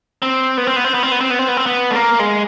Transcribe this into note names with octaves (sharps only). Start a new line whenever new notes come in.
C4
B3
C4
B3
C4
B3
C4
B3
C4
B3
C4
B3
C4
B3
A3
A#3
G#3